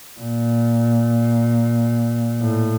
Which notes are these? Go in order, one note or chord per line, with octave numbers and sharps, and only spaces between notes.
A#2
A2